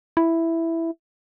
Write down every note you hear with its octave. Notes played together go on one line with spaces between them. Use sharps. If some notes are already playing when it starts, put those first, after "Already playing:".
E4